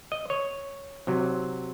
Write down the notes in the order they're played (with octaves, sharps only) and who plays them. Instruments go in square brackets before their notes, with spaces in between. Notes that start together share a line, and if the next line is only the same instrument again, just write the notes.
[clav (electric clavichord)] D#5
C#5
C3 F#3